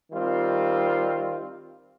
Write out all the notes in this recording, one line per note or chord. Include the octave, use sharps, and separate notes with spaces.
D#3 G3 C4 F4